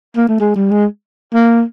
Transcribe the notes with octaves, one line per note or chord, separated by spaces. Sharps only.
A#3
A3
G#3
G3
G#3
A#3